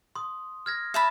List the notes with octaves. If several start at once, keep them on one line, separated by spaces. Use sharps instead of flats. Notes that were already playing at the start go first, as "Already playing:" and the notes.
C6 D#6
F6 G#6 A#6
E5 A5 B5